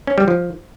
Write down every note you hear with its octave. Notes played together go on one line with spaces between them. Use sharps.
C#4
G3
F3